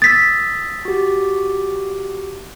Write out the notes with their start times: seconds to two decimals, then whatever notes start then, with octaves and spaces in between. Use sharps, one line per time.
0.02 D#6 E6 A6 B6
0.85 F#4 G4